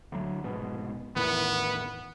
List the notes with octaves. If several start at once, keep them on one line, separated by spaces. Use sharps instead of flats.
D2 F#3
F1 G#2 B2
E2 A2 D#3 B3